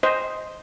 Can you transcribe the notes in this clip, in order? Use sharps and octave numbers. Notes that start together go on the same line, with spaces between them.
C5 D#5